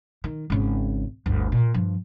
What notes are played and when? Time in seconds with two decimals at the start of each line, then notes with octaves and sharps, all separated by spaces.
0.24 D#3
0.50 G#1 C#3
1.26 G1 D2
1.52 A#2
1.74 G2 F3